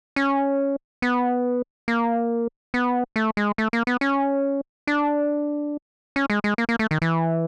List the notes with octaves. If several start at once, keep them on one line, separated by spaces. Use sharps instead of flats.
C#4
B3
A#3
B3
A3
G#3
A3
A#3
B3
C#4
D4
C#4
G#3
G#3
A#3
A#3
A3
D#3
E3